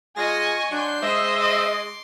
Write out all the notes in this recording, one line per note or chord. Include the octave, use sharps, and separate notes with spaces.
G#3 F4 G#4 D#5 G#5 C#6 A#6
F#3 C#4 D4 C6 G6
G#3 C5 D#5 E5
C6 D6